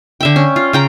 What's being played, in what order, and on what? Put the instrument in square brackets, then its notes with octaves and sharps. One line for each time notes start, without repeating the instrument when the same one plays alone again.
[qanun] D3 E5 G5
C#4
F4
C#3 G5 A#5